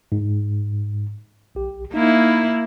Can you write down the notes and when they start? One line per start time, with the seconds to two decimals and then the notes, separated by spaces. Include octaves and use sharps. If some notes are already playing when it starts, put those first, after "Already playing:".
0.12 G#2
1.55 B1 G4
1.94 A#3 D#4 E4